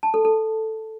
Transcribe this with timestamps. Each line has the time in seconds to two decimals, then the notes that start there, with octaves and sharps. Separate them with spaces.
0.03 A5
0.14 A4
0.25 A4